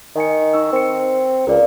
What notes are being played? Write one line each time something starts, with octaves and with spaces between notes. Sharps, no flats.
D#3 D#5 G#5 C#7
D#4 C#6 E6
C4 C5 C#7
C#2 A#4 D5 F5